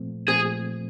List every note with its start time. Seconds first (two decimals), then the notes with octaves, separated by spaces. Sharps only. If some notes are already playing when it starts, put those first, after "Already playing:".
Already playing: A#2 F3 A3 C4
0.28 A#2 F3 A3 C4 G#4